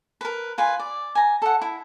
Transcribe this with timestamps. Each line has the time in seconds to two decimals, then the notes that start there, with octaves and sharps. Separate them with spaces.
0.21 A#4 B4
0.58 F4 B4 G#5
0.79 D5
1.15 G#5 A#5
1.42 A4 F#5
1.61 E4